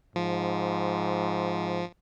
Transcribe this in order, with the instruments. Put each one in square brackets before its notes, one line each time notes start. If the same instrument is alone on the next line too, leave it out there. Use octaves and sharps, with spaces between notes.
[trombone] G#2 [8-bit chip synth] F3